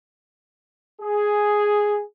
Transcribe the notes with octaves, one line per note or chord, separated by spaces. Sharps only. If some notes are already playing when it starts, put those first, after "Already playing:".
G#4